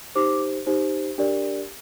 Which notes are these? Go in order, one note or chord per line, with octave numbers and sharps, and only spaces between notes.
D#4 G4 C5 D6
D#4 G4 C5
D4 G4 A#4 D5